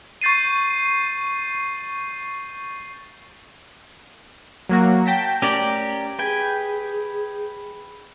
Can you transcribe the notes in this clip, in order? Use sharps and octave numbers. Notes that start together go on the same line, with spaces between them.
C#6 G6 A6 C7 D#7
F#3 A#3 F#4
G5 A5 A#6 B6
A3 C#4 G4 A#4 D5
G#4 B4 G5 G#5